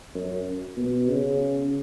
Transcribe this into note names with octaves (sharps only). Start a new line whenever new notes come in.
F#2
B2
C#3